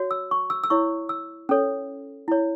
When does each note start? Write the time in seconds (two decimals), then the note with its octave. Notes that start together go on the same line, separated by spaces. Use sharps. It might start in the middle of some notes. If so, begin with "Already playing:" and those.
Already playing: F#4 C#5
0.11 E6
0.31 C#6
0.50 E6
0.64 E6
0.70 E4 C#5 C#6
1.09 E6
1.49 C#4 A4 C#5
2.28 E4 C#5